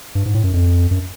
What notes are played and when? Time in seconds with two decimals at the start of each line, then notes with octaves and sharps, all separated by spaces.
0.15 G2
0.26 G#2
0.34 A2
0.44 F#2
0.53 F2
0.91 F#2